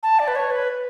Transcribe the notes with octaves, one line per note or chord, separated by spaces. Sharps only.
A5
D5
B4
C#5
B4